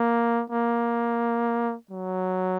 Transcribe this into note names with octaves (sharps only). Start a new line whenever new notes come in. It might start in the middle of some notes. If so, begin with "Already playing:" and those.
Already playing: A#3
A#3
F#3